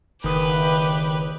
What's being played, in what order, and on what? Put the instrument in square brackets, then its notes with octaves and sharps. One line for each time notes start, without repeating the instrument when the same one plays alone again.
[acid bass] F#1 [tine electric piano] D#3 D#6 [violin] G4 B4